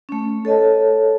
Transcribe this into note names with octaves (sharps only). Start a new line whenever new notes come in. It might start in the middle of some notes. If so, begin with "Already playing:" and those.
A3 C#4
A4 C#5 D#5 A5